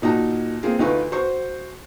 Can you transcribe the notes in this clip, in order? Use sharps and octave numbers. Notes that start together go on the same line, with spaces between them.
A#2 D#4 F#4 A5
A#3 C4 F4 G#4
D2 D#4 F4 B4 C#6
F#4 C5 C#6